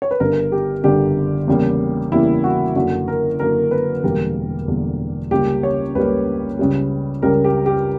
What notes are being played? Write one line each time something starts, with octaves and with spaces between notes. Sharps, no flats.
C#5
B4
G1 G2 D3 A#4
G4
G1 G2 D3 G4
E2 C#3 G3 A#3
E2 C#3 G3 A#3 E4
F#4
F#2 D3 A#3 F#4
A#4
F#2 D3 A#3 A#4
B4
E1 E2 D3 G3 A#3 A#4
E1 E2 D3 G3 A#3
C#2 C#3 G3 A#3 G4
C#5
C#2 C#3 G3 A#3 B4
C#2 C#3 G3
C#2 C#3 G3 A#4
G4
G4